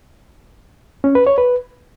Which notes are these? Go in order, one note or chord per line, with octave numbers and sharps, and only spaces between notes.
C#4
B4
C#5
B4